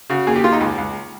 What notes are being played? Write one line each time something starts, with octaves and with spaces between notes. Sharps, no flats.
C#3 F#4
D#2 G#4
G4
D#2 F4
D#4
C#2
C#2